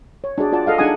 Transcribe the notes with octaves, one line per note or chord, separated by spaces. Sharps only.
C#5
D4 F#4 G#4 D5
F4 D5 F#5 A5
A4 D#5 F5 F#5
D4 D#4 G#4 F#5 G#5 D#6